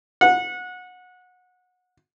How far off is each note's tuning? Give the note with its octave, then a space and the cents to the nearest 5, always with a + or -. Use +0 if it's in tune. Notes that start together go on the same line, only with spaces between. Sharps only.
F#5 -25